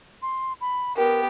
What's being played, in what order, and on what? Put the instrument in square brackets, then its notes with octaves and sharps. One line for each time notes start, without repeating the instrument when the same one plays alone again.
[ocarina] C6
B5
[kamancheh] B3 G4 [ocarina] A#4